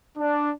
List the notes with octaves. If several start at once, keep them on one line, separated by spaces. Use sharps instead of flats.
D4